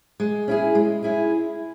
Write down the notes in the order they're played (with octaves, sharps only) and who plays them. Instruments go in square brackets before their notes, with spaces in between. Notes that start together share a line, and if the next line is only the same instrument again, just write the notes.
[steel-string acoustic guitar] G#3
C#4 E4 G#4
G#3
C#4 E4 G#4